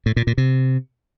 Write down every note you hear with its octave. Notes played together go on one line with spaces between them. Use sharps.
A2
A#2
A#2
C3